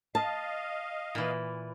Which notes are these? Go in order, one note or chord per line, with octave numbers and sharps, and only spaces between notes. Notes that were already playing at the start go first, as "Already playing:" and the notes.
D#5 F5 A5
A#2 E3